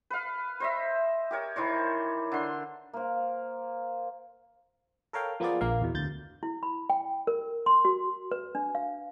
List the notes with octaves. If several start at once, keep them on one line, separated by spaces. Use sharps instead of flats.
B4 F5
C5 D#5 E5
G4 A#4 C#5
D#3 E3 C5 C#5
D3 C6
A#3 C5
A4 A#4 C#5 F5 G5
F3 A#3 B3 F4 G#4 D5
A#1 A#3 F5
E2 B2
D2 G6 A6
E4
B5
G5
A#4
C6
F#4
B4
D4
F5